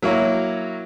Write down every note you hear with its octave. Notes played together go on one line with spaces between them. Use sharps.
F#3 A#3 E4 C#5